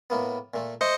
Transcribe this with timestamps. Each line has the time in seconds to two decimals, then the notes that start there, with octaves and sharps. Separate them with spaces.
0.10 A2 A#3 B3
0.54 A#2 A3
0.81 A3 C5 D#5 C#7